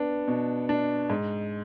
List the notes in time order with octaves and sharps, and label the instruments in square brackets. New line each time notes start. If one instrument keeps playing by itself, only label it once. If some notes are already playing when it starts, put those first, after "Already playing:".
Already playing: [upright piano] B3 D4
B2
D4
G#2